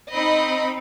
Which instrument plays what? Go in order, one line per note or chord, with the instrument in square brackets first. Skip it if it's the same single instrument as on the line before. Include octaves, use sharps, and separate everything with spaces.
[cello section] C4 D#4 [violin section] D#5 B5